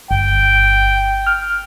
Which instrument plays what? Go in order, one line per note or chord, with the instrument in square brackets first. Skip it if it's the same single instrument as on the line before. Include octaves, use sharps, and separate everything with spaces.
[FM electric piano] G1 [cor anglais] G5
[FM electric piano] F6